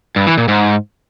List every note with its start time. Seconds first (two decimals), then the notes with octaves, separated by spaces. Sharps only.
0.16 G2
0.27 E3
0.38 A#2
0.48 G#2